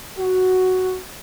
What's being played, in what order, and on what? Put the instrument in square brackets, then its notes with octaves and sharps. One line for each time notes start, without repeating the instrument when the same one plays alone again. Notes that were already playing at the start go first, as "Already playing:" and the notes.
[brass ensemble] F#4